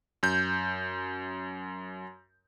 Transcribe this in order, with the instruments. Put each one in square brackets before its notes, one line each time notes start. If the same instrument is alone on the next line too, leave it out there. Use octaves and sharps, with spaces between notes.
[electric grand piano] F#2 G6